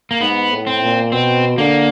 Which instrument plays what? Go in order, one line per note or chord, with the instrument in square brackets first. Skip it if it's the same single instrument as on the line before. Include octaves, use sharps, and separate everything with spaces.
[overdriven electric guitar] A#3
[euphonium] G#2 [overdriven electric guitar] B3
[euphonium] A2
[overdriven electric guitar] C4
[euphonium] A#2
[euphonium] B2 [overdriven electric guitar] C4
[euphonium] D3 [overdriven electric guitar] A#3